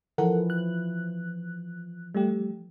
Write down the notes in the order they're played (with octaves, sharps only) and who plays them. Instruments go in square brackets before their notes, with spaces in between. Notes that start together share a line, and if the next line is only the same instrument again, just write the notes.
[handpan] E3 F3 [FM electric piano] A4 A#4 F#5
[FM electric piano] F#6
G3 A3 G4